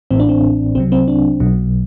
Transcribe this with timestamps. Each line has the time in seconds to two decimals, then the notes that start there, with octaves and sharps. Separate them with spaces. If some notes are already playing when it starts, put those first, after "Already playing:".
0.11 A1 A2 E3 C4
0.20 D4
0.29 C4
0.75 C2 C3 F#3 C4
0.92 C4
1.08 D4
1.40 B1 B2 F#3